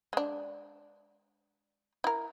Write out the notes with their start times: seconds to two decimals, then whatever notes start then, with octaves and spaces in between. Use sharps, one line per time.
0.13 G#3 D4
2.04 E4 A#4